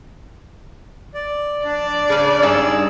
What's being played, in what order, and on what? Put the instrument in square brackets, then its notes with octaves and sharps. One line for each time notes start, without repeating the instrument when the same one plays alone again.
[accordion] D5
[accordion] D4 [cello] D5
[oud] C#3 C#4
[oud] G2 C#4 D#4 [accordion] G#4 E6